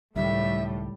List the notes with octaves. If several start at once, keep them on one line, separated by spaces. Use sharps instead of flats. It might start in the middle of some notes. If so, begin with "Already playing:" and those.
C#2 A2 D#3 G3 E5